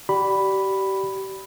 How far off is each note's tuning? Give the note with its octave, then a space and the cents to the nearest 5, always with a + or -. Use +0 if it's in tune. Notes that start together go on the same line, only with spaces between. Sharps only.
G4 -30 D5 +0 B5 +0